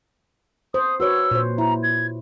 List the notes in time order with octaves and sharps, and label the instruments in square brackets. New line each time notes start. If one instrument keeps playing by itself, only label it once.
[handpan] C5 [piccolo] D#6
[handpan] F#4 B4 C#5 [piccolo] E6
[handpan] A#2 C5
[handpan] E4 [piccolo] A#5
[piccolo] G#6